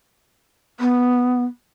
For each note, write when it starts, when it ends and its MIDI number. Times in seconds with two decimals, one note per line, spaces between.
0.80 1.44 59